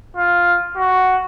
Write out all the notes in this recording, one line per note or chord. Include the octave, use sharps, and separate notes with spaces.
F4
F#4